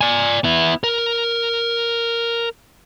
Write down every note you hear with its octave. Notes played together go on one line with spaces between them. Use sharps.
D5 G#5
B3 E4
A#4